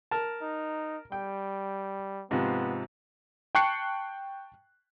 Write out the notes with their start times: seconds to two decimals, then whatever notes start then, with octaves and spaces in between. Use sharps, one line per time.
0.11 A#4 A5
0.41 D#4
1.12 G3 G5
2.31 G#2 C3 F3 B3
3.55 G5 A5 C#6 F#6 C7 C#7